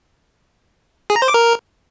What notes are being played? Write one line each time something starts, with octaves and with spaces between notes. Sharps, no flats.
G#4
A#5
C5
D6
A#4